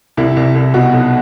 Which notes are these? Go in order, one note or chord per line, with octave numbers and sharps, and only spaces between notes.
C2 E4
C2
C2
B2 F#4
B1